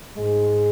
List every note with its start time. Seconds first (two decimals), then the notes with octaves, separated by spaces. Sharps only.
0.18 G#2 G#3